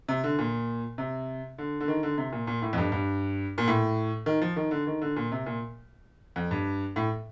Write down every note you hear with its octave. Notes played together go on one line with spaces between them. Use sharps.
C3
D3
A#2
C3
D3
D3
D#3
D3
C3
A#2
A#2
A2
F2
G2
G2
A#2
A2
D#3
F3
D#3
D3
D#3
D3
A#2
C3
A#2
F2
G2
A2